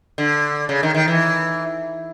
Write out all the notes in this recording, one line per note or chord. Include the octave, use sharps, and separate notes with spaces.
D3
C#3
D#3
D#3
E3